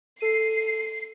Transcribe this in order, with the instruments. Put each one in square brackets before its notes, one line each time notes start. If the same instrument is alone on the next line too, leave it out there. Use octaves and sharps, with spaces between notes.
[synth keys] A4 D#7 [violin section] C7